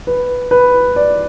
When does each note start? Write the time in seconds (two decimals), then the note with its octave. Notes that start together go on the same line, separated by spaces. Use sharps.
0.07 B4
0.51 B4
0.96 D5